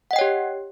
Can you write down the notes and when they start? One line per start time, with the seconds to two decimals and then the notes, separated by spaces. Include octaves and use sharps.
0.11 F#5
0.13 D#5
0.16 G5
0.19 C#5
0.21 G4